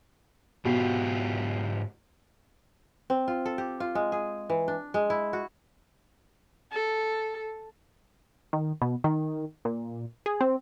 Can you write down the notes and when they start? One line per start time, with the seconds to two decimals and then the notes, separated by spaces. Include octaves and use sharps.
0.65 G#2 B2 F4 G4
3.10 C4
3.28 F4
3.46 A4
3.58 G4
3.80 F4
3.95 G#3
4.12 G#4
4.50 E3
4.68 D4
4.94 G#3
5.10 E4
5.33 F#4
6.72 A4
8.53 D#3
8.82 B2
9.04 D#3
9.65 A#2
10.26 G#4
10.41 C4